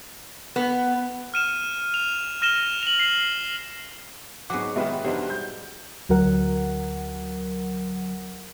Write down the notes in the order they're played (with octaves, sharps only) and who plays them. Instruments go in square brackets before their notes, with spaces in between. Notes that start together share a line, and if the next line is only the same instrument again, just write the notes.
[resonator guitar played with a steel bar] B3
[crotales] F6 D#7 E7
F7
F6 A#6 D#7 E7 G7
F7 F#7
C7
[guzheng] G#2 F#3 [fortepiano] B3 G#4 F#5 [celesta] D6
[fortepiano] B2 D#3 [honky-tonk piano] G#3 F#4 B4 [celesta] E5 G5
[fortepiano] B1 E2 D4 [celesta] G4 C5 D#5
[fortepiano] G3 [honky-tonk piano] G6
[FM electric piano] D2 F#3 A#4 F#5